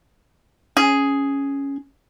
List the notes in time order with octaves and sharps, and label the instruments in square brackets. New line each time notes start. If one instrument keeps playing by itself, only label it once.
[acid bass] C#4 [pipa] G#4